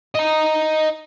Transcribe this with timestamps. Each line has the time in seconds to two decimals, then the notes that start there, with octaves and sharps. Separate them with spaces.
0.15 D#5 A#5